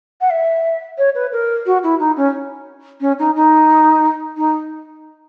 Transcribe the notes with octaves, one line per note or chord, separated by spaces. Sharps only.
F#5
E5
C#5
B4
A#4
F#4
E4
D#4
C#4
C#4
D#4
D#4
D#4